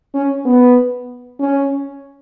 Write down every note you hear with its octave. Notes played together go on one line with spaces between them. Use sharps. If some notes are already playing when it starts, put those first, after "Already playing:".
C#4
B3
C#4